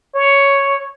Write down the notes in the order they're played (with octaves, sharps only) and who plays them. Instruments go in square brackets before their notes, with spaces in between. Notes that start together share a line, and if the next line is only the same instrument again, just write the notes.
[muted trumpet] C#5